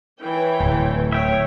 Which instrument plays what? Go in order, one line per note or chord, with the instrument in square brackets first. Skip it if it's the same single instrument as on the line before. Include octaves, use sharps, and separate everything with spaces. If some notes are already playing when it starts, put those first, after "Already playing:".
[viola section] E3 C#5 G5
[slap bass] D1
[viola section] C#5 [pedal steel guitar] E5 G5